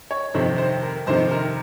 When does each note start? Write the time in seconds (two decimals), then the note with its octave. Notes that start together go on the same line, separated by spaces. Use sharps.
0.11 C#5
0.34 F2 C3 D#3 C5
0.58 C5
0.83 A#4
1.06 F2 C3 D#3 C5
1.31 A#4